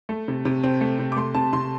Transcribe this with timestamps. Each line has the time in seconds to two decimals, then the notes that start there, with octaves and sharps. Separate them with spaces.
0.09 A3
0.28 C3
0.45 C3
0.63 C4
0.81 A3
0.99 C3
1.12 D6
1.17 A3 C6
1.34 C3 A5
1.53 C3 C6